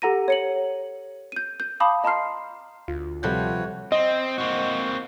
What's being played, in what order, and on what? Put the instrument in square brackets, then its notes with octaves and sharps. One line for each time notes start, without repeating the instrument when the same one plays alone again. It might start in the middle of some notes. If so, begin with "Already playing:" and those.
[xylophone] G4 A4 F#5 A#5 A#6 D#7
C#5 C#7 F#7
G6 D#7
G6
F5 A5 B5 D6 D#6
D#5 A5 A#5 C6 F6 C7
[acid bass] D2 [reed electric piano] F4
[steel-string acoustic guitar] C3 F3 [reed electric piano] G3 A4 G6 [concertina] F#4 B4 C#5
[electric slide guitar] C4 [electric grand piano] D#5
[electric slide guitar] A#3 C4 F#4